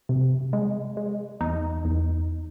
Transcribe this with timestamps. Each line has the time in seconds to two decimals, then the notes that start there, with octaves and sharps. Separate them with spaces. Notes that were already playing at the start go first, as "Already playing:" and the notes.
0.09 C3
0.53 G#3
0.97 G#3
1.41 E2 D#4
1.85 E2